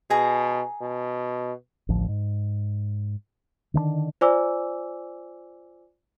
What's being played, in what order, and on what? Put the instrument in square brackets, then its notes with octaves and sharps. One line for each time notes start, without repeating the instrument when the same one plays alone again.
[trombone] B2 [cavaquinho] G#4 A#5
[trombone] B2
[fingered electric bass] A1 D2 F3
G#2
D3 D#3 G#3 D4
[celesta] F4 C5 D5 G#5 D6 E6